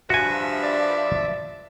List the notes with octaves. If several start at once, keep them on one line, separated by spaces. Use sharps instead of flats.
G2 F3 F#4 E5 G#5
D5